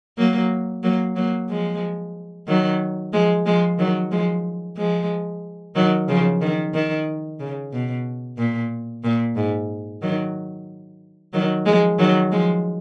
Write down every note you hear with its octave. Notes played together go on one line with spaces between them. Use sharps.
F#3 A#3
F#3 A#3
F#3 A#3
F3 G#3
D#3 F#3
F3 G#3
F3 G#3
D#3 F#3
F3 G#3
F3 G#3
D#3 F#3
C#3 F3
D#3
D#3
C#3
B2
A#2
A#2
G#2
D#3 F#3
D#3 F#3
F3 G#3
D#3 F#3
F3 G#3